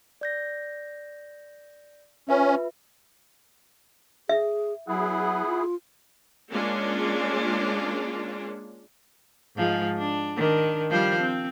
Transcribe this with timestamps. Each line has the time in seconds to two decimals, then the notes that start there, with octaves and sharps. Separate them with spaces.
0.21 D5 G6 A#6
2.29 C#4 F4 B4 E5
4.29 G#4 E5
4.88 F#3 B3 E4 G#4 F#5 D#6
5.46 F4
6.51 G#3 A#3 C#4 D4 F4
9.56 G#2 F3 G#3
9.98 D4
10.36 D#3 D4
10.90 F3 G3 C5
11.20 C4